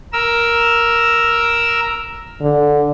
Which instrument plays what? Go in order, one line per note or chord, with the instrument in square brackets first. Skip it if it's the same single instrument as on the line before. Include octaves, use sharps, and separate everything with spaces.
[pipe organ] A#4 E6
[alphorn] D3